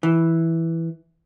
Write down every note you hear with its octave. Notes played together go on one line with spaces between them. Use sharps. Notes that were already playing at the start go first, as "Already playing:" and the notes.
E3